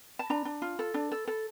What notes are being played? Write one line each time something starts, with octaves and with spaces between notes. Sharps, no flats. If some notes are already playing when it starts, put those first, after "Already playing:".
A5
D4 A#5
D4
F4
A4
D4
A4
A4